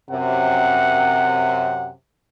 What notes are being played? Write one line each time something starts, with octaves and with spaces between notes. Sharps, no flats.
F#2 C3 F#5